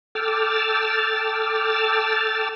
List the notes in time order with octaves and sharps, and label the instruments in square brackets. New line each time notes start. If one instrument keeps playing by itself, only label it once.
[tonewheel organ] A4 G5 D6 E6 F6 A6